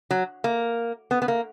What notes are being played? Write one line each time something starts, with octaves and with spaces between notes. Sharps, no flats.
F#3
A#3
B3
B3
A#3